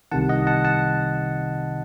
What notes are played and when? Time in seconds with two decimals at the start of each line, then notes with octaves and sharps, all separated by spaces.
0.11 C2 C3 D#3 F#5 A5
0.29 D#5 F#5
0.47 F#5 A5
0.65 F#5 A5